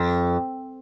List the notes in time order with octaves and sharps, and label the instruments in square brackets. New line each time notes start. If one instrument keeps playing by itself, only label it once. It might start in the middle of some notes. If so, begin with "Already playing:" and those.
Already playing: [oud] F2